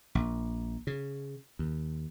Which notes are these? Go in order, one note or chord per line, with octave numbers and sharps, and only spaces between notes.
A#1
C#3
D#2